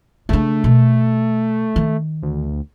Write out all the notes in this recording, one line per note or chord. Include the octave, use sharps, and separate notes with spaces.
C#3 A3 D4
B2
D#3
D2